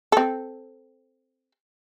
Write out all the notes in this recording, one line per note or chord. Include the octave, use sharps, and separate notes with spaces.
C4 A4